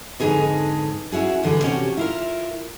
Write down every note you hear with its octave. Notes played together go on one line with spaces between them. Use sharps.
F2 G#2 D3 D#4 G#4 B4
C#4 E4 F#4 G#4
E2 D3 G#4 B4
C3 B3 C#4 D4 F#4 G4
E4 F4 A#4